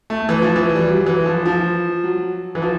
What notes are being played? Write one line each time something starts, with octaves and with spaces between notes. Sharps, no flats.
A3
E3
F3
E3
G3
F#3
E3
F3
F3
F#3
E3
F3